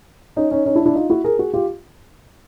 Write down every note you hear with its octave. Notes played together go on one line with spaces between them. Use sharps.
C#4 D#4
C#4 D#4
C#4 D#4
D4 E4
D4 E4
D#4 F4
E4 F#4
G#4 A#4
F#4 G#4
F4 G4